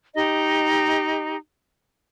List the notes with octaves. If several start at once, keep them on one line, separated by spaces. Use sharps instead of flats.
D#4 G4 D#5